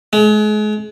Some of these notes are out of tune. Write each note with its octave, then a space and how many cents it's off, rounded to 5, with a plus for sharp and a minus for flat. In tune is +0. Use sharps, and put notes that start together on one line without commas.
G#3 +35